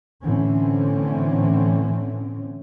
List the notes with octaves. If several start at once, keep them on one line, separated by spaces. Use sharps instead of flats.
A2 D3 E3 C4 C#4